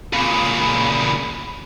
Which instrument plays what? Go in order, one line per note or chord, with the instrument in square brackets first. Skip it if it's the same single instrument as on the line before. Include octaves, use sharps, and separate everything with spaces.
[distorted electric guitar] A#2 C#3 [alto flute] B5